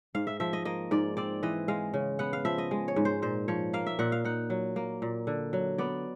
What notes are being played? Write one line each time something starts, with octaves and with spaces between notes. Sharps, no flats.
G#2 F5
E5
F3 E5
D#5
A#3 D#5
G#2 D5
C4 D5
E3 D#5
G#3 F5
C#3
B3 F#5
F5
F3 E5
D#5
G#3
C#5
G#2
C5
A#2 C5
F3 C#5
A#3 F5
E5
A#2 F#5
F5
D#4 F#5
F#3
A#3
A#2
D3
F#3
B3 D5